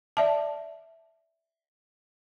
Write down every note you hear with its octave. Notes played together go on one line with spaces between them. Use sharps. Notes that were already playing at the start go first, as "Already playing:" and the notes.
D5 E5 A5